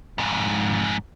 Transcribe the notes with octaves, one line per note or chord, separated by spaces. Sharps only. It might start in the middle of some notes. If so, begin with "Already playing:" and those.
F2 G#2